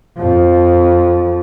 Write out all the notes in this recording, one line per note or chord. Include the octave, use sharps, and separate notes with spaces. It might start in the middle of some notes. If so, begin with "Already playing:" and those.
F2 F3